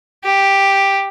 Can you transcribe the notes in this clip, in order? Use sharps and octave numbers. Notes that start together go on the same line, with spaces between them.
G4